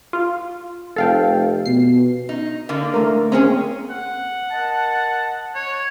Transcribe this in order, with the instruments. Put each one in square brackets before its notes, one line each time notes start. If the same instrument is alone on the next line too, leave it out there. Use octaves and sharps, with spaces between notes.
[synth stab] F4
[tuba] F1 [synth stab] A4 F5 G5
[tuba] B2 [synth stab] C7
[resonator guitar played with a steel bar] D#4
D3 A#3
[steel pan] A3 A#4
[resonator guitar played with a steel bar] G#3 C#4 G#4 [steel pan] A#3 C4
[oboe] F#5
[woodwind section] A#4 D#5 A5
[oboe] C#5